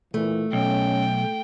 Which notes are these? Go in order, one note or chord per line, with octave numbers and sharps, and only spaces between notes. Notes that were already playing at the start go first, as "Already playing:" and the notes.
A#2 E3 A3
B1 C#4 G5